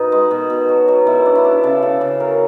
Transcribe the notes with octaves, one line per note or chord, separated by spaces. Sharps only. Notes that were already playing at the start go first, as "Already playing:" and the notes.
Already playing: B2 B3 D#4
G#3
B2
B2
F#3
F#3
B2 E4
D4
E4
D4
C#3 A4
C#3
C#3
F#3 A#4